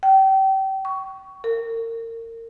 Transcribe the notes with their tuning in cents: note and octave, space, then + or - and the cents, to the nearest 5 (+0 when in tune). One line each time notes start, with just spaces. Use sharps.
G5 -30
C#6 +15
A#4 -30